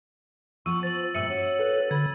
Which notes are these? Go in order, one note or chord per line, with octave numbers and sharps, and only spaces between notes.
F3 B3 F4 C#6 E6 D#7
C5 A6 F#7
G2 A#2 A#4 E5 E6 C#7 D#7 F#7
C#4 F#4 C#5
A4 B4
D3 B5 G#6 A6